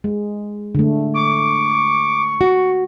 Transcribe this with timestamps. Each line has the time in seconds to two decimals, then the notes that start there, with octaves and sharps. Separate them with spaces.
0.04 G#3
0.75 D3 A3
1.14 C#6 D6
2.41 F#4